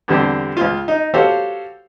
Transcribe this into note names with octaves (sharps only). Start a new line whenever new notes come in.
E2 D3 G3 C4 D4 G4
C#2 F4
D#4
F#4 G4 A4 C5 C#5 F5